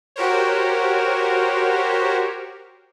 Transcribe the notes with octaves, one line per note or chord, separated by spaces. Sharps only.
F#4 G4 A#4 C5 C#5